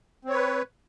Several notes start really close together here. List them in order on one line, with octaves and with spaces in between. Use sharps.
C4 C#5 B4